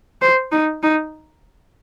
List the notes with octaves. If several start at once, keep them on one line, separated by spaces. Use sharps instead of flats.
C5
D#4
D#4